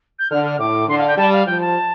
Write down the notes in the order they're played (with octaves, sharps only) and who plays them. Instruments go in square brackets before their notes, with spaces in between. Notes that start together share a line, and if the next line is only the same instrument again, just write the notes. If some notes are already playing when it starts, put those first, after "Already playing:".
[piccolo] G6
[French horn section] D3 [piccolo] F6
[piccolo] F6
[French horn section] A2 [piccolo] D6
[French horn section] D3 [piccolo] C6
[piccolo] F5
G5
[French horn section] G3 [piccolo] A5
[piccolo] F5
[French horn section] F3 [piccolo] G5
[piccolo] A5